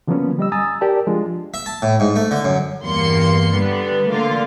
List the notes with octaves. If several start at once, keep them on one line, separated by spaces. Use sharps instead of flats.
D3 F3 F#3 A#3 B3 C#4
G3 D#5 E6
G#5 A#5 D#6 E6 A6
G4 A#4 D5 A5
F3 G#3 D4 F4
E5
A5
A2
G#2
A3
D3
F#2
E2 G2 A#3 C6 C#7
D3 G3 B3
D3 A3 A#3 F4